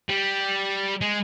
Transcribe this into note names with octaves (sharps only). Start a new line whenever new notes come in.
G3
G#3